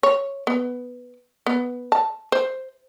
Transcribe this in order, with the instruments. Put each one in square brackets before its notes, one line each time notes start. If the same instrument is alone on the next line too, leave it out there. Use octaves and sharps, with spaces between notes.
[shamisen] C#5
B3
B3
A5
C5